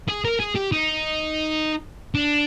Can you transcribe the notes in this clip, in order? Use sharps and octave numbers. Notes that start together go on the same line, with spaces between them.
G#4
A#4
G#4
G4
D#4
D4